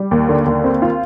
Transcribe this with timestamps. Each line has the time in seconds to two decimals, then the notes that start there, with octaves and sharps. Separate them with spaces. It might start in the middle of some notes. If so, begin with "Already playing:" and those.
Already playing: G3
0.11 D#2
0.29 D3
0.46 D#2
0.64 C4
0.82 F4